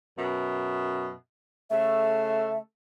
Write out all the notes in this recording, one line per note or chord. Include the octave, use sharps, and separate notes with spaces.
F#2 B2 E5
C#3 A3 E5